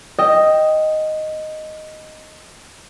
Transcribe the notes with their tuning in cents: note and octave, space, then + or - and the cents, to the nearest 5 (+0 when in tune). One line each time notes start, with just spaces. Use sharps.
D#5 +0 G5 +0 E6 +20